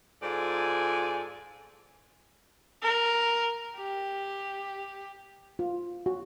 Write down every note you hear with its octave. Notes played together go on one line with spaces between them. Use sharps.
G#2 F4 A4 D5 G#5
A#4
G4
F4
F#4